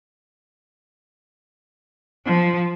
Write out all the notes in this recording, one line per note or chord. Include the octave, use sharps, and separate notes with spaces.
F3